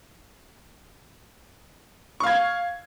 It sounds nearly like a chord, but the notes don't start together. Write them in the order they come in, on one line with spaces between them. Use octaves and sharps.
C#6 F5 G#6